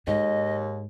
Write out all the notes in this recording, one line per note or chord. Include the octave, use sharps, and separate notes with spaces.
D#2 G#2 D#5